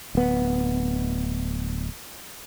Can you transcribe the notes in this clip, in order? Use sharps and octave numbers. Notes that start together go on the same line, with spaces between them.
D1 B3